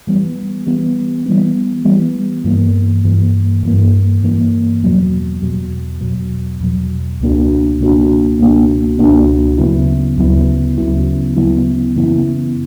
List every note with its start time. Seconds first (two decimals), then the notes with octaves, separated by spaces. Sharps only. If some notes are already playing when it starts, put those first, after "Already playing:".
0.07 E3 G3 B3
0.67 E3 G3 B3
1.26 E3 G3 B3
1.85 E3 G3 B3
2.45 G2 E3 A#3
3.05 G2 E3 A#3
3.63 G2 E3 A#3
4.23 G2 E3 A#3
4.83 E2 B2 F#3
5.42 E2 B2 F#3
6.01 E2 B2 F#3
6.60 E2 B2 F#3
7.20 C#2 B2 A#3 D4 F#4
7.79 C#2 B2 A#3 D4 F#4
8.40 C#2 B2 A#3 D4 F#4
8.99 C#2 B2 A#3 D4 F#4
9.58 D2 C#3 F#3 B3 E4
10.17 D2 C#3 F#3 B3 E4
10.78 D2 C#3 F#3 B3 E4
11.36 D2 C#3 F#3 B3 E4
11.96 F#2 C#3 E3 B3 E4